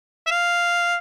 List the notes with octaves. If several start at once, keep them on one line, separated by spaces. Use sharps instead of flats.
E5
F5